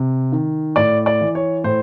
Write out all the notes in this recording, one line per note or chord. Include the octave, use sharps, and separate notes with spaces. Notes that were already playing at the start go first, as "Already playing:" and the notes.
Already playing: C3
D#3
A2 D5
D5
E3
C#5
A2 C5